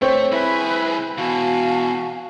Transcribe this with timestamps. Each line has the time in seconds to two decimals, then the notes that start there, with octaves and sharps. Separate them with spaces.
0.02 A3 C4 C#5
0.32 C2 E4 G#4 B4 E5
1.18 B2 E3 F#4 F5 G#5 A5